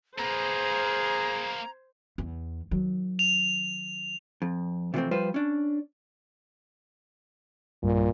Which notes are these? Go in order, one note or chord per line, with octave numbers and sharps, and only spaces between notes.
A#3 G#4 B4 C5 A#5
E2
D#3 F#3
F7
F2
C3 E3 F3 G3 A3 C4
F3 G3 F4 B4 C5
C#4 D4
B1 G2 A#2 G3